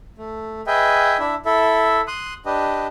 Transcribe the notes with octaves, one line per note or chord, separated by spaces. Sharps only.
A3
G#4 B4 D#5 E5 G5
D4 E4 E5
E4 A4 E5
C6 D#6 F#6
D4 G4 B4 D#5